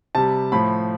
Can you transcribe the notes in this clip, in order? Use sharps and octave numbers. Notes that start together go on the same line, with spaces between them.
C3 G3 A5
A2 F3 B5